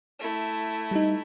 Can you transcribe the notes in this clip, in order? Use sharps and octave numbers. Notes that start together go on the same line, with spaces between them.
A3 E4
G3 D#4